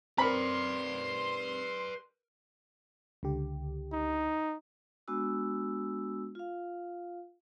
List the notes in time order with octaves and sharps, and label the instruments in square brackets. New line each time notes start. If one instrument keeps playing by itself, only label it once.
[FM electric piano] C4 [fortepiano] A#4 B5 [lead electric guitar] B4 D5 [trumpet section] C6
[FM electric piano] C#2 D3 G4
[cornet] D#4
[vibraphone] G#3 B3 D4 F#4 E6
F4 F5